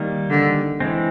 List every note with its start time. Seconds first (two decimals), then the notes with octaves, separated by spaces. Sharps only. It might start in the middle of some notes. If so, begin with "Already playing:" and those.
Already playing: D#3 G3 A#3
0.30 D3
0.80 E3 G#3 C4